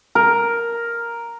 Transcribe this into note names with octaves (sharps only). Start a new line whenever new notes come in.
A#4